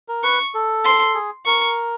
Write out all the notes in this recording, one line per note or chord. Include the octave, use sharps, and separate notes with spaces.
A#4
B4 C#6
A4
C6
G#4
A#4 C#6